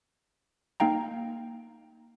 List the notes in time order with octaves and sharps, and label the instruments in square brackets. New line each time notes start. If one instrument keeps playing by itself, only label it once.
[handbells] A#3 D#4 F5 G5 A#5